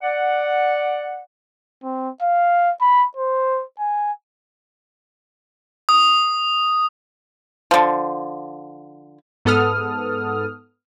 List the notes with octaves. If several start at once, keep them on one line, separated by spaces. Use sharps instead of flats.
D5 F#5
C4
F5
B5
C5
G#5
D#6
D3 F3
G#2 B3 A4 D#6 F6